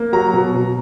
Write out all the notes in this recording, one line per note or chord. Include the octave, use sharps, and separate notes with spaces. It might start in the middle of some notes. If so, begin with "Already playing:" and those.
Already playing: A#3
F#3 A#5
B2
B2